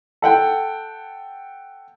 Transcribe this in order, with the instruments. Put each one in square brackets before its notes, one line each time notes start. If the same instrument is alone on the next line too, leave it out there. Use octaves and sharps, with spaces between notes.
[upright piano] A4 F#5 G5